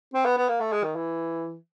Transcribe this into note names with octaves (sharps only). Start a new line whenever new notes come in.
C4
B3
B3
A#3
A3
G#3
D#3
E3